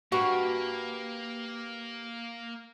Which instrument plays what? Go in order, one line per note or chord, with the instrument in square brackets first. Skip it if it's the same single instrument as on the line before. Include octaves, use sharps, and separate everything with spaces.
[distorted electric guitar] A#3 [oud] F#4 [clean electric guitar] G4 B4